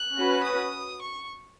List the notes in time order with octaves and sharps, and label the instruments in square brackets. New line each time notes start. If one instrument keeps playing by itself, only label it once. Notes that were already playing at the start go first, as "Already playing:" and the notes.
Already playing: [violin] F#6
[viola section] C#4 F#4 B4
[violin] D#6
C#6